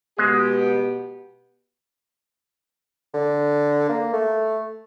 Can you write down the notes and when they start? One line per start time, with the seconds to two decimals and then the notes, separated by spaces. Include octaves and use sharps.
0.19 B2 G#3 B3 G4
3.14 D3
3.89 A#3
4.13 A3